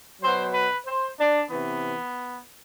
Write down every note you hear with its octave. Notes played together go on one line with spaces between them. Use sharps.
B2 F#3 C5
B4
C5
D4
C3 E3 B3